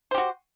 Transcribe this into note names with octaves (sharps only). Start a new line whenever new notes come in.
F#4 G4 C5